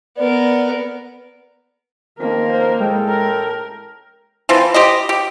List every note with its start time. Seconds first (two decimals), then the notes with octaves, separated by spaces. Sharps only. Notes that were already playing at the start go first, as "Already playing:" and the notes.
0.17 B3 A#4 D5
2.20 D#3 F3 A#3 C4 A#4
2.49 C5
2.80 A2 G#3 A4 G5
3.09 A#4
4.49 E3 F3 C4
4.74 G4 C5 D#5
5.09 G4